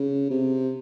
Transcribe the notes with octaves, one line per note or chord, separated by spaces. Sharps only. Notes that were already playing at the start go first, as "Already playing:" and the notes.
Already playing: C#3
C3